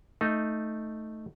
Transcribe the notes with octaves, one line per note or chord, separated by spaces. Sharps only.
A3 D#4